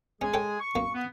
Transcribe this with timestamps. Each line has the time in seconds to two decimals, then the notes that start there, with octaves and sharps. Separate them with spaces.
0.21 G#3 C#4 G#4 G#5
0.34 A4 C#5 G5
0.60 C#6
0.75 F#2 A#3
0.94 B3